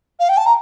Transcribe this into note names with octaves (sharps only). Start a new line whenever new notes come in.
F5
G5
A5
A#5